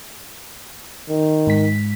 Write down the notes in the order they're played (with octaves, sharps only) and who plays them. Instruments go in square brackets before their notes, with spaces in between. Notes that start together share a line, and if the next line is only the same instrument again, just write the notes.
[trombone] D#3
[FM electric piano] G#2 B6